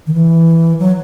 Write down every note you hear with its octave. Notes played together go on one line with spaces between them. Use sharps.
D#3
E3
F#3